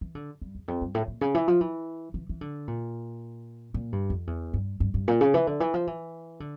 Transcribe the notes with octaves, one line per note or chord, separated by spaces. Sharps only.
E3
D3
G2
E2
F2
G2
A2
A#2
C#3
E3
F3
E3
E3
E3
D3
A#2
A#2
G2
F2
E2
G2
G2
G2
A#2
C#3
E3
D3
E3
F3
E3
D3